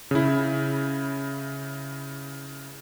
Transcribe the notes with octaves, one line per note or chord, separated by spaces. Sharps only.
C#3 E4